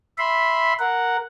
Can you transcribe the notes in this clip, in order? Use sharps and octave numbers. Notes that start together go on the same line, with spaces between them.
E5 B5 C6
A#4 F#5